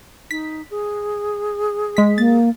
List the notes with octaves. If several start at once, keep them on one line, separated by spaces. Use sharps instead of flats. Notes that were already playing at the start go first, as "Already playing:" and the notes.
D#4 B6
G#4
G#3 B6
A#3 A6